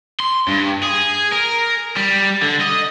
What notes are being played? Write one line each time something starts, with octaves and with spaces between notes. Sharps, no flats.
C6
G2
G#4
A#4
G3
D3
D#5